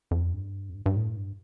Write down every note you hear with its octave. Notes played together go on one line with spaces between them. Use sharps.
F2
G2
F2
G2
G2
A2
G2